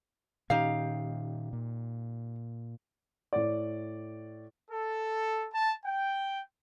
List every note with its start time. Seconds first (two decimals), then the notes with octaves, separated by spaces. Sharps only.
0.50 A#2 D#3 C#4 D#4 G4 F5
1.53 A#2
3.33 A2 D5
4.70 A4
5.52 A5
5.84 G5